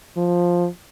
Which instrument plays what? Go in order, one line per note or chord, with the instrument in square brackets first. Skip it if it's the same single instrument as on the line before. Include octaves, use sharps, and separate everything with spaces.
[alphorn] F3